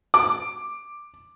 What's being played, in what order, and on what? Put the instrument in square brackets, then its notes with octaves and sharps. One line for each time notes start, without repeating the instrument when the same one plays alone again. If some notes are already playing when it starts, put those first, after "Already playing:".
[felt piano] D6